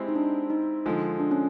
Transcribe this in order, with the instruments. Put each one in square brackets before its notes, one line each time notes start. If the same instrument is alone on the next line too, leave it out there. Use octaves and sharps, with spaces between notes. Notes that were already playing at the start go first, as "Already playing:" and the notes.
Already playing: [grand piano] G#3 C4 E4 G4
[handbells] D#4
D4
D#4
[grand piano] D3 F3 G#3
[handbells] D4
C#4